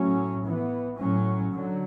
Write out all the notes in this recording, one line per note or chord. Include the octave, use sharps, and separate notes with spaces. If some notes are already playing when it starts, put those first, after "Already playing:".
Already playing: A2 F#3 C#4
E3 B3
A2 F#3 C#4
D3 F#3